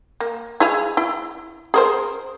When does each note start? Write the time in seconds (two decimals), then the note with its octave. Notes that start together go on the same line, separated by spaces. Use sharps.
0.20 A#3
0.60 E4 G#4 F5
0.97 E4
1.74 G#4 A#4 C5